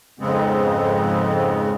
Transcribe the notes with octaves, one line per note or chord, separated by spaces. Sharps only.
F2 G#2 C#3 G#3 B3 C4